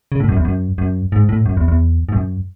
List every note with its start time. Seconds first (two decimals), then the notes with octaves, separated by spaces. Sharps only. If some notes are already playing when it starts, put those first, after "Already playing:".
0.12 C#3
0.20 A2
0.29 F#2
0.37 E2
0.45 F#2
0.78 F#2
1.12 G#2
1.29 A2
1.46 F#2
1.57 E2
1.68 E2
2.09 G#2
2.13 F#2